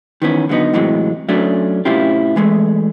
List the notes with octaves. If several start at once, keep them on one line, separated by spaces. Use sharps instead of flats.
D#3 E3 B3 C#4
D3 F#3 G#3 B3 D#4
A2 C3 E3 F#3 G#3
F#3 A3 C#4 D4
A2 C3 C#4 E4 F4 G4
E3 G#3 A3